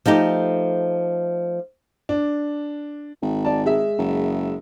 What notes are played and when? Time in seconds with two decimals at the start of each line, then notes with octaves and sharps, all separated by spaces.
0.06 F3 A3 D#4 G4
2.09 D4
3.22 G#1
3.45 D5 A5
3.66 G#3 E5
3.99 F#1